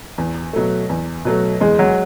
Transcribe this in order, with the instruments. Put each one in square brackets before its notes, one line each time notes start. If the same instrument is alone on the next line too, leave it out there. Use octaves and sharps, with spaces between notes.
[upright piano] E2
B2 F#3 A3
E2
B2 F#3 A3
[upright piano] E2 [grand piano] G#3
[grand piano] F#3